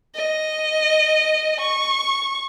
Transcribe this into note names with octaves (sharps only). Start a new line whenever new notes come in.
D#5
C#6